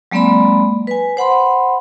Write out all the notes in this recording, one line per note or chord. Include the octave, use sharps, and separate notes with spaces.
F#3 G#3 A#3 C4 D5 B5
B4 G#5
C5 F#5 B5 C6